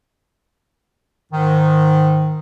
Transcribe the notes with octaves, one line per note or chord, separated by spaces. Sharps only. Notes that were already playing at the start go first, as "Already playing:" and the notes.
G#2 D#3